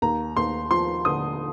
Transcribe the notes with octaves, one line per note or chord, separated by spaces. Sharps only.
D#2 A#5
D#2 C6
F3 C6
D3 D#6